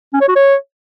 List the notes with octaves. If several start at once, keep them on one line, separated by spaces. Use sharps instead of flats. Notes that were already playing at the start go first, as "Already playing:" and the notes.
C#4
C#5
F#4
C#5